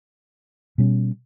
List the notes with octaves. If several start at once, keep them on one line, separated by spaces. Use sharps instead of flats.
B2 G3 C#4